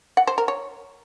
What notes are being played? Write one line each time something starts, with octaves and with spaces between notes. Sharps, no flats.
F#5
C5
A#4
C#5